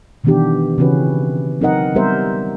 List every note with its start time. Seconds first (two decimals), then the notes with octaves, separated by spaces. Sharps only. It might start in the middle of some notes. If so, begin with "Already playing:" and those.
0.24 B2 D#3 E3 B3 D4 G4
0.78 C#3 E3 C4 C#4 F#4 B4
1.61 F#3 C4 D#4 A#4 D#5 F#5
1.95 G3 B3 G4 A#4 C5 E5